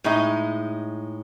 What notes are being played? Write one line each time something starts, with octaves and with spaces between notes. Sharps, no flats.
A2 G#3 D#4